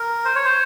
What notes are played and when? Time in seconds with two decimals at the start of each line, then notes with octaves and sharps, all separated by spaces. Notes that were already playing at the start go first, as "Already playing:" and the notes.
Already playing: A#4
0.25 C5
0.35 C#5
0.45 C5